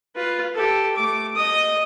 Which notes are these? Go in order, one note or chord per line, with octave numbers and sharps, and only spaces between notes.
F4 B4
G4 A4
A3 D6
D#5 D#6